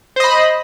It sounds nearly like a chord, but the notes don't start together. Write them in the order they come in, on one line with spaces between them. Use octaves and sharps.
C5 D#5 B5